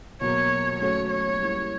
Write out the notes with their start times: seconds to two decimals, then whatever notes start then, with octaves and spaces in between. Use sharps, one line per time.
0.21 B2 F#3 A#3 C#5
0.80 F#3 A3 C#4 F#4 A4 C#5
1.10 C#5
1.40 G3 A#3 C#4 E4